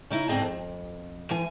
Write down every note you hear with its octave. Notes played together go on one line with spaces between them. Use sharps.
C#3 D#4 E4
D2 G#2 C4 G#4 D#5 A5
F2
E3 G#5